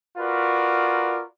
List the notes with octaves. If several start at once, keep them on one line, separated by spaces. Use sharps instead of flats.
F4 F#4 A#4 B4 D5